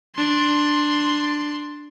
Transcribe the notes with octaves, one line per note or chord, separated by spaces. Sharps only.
D4 C6